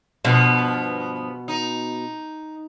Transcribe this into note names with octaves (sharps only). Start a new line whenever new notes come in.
G2 B2 F3 B3
D#4